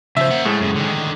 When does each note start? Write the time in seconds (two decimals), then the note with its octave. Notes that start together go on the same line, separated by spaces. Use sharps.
0.17 C#3 F3 C5 E5
0.31 A#3 F#5
0.45 A2 G#3 A3
0.60 F#2 C#3
0.76 D3 D#3